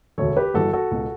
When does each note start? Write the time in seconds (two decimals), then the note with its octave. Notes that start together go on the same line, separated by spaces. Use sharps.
0.18 E1 D2 D3 A4 C#5
0.36 G4 B4
0.54 G1 G2 E3 F#4 A4
0.73 F#4 A4
0.91 C#2 B2